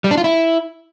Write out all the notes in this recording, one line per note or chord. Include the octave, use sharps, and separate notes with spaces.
G3
D4
F4
E4